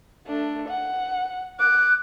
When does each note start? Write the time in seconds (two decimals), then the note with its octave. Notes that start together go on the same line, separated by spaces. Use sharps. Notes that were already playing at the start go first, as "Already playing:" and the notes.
0.27 A3 D4
0.69 F#5
1.60 D6 F#6